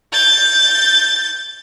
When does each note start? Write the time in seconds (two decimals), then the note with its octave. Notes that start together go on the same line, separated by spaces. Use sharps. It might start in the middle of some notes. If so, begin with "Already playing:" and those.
0.13 G6 A6